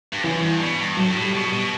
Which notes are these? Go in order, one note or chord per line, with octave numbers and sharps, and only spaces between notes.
G2
F#2 E3
G2
B2
G2
A2 F#3
G2
A2
G3
B2
G3
B2